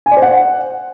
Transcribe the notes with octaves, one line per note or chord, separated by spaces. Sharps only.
G#5
D5
C5
F#5